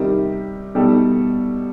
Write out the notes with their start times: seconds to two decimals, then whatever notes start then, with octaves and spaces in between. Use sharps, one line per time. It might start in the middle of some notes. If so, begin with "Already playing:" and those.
Already playing: C3 D#3 G3 D#4 G4
0.75 B2 G3 D#4 A4